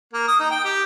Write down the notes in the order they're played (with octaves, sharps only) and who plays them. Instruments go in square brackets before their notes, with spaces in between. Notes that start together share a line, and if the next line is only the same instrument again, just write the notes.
[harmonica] A#3
D#6
D#4
G5
G4